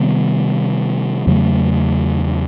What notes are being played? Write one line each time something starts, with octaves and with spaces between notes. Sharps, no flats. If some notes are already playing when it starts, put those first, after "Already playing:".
Already playing: C3 D#3 G3 B3
E2 C#3 F#3 A3